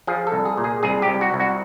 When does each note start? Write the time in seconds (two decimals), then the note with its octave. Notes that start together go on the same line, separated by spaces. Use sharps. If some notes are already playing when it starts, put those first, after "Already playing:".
0.07 F3 G#4
0.27 A4
0.32 C2
0.45 G#4
0.57 A#2
0.64 G#4
0.83 C2 G#4
1.02 G4
1.08 C2
1.21 F#4
1.34 C2
1.40 F#4